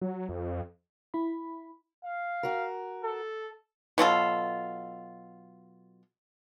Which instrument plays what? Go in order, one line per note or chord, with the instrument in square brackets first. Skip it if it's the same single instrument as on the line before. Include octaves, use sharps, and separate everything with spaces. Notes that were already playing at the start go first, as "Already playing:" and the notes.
[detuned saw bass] F#3
F2
[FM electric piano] E4 B5
[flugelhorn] F5
[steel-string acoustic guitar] F#4 A#4
[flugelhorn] A4
[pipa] B2 F#3 F4 A4